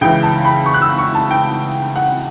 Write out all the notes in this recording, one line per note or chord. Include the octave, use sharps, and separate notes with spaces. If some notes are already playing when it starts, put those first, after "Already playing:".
C#2 C#3 E3 G5
A5
B5
C#6
F#6
E6
C#6
A5
G5
F#5